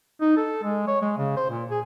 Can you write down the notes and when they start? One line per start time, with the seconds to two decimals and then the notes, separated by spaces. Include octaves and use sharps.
0.21 D#4
0.37 A4
0.63 G#3
0.87 C#5
1.02 G#3
1.18 C#3
1.37 C5
1.50 A#2
1.70 G#4